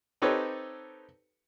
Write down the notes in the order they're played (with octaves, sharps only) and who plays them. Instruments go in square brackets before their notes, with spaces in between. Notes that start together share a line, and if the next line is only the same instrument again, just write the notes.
[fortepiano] C4 D#4 G4 A4 B4 C#5